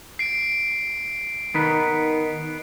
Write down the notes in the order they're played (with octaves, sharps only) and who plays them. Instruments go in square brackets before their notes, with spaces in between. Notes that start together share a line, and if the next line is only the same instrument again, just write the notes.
[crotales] C7 D7
[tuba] D#3 [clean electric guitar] B3 D#4 B4